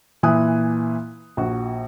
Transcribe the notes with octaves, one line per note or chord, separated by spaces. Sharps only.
A#2 E3 E4 G#5 D#6 F#6
A#1 F#4